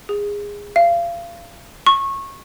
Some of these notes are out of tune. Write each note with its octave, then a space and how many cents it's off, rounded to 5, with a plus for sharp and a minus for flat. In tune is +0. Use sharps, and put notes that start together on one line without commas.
G#4 -20
F5 -30
C#6 -20